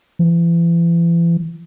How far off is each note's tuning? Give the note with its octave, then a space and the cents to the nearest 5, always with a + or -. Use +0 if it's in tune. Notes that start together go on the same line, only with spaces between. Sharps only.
E3 +40